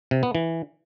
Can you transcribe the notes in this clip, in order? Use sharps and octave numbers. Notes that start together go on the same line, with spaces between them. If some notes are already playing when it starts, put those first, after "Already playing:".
C3
B3
E3